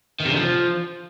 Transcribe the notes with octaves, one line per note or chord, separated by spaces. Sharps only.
D#3
C3
D3
F3